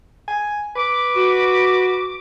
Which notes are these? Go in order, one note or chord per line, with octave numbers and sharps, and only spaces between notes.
G#5
B4 D6
F#4